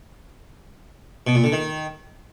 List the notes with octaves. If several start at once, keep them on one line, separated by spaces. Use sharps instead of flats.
B2
A#2
D3
D#3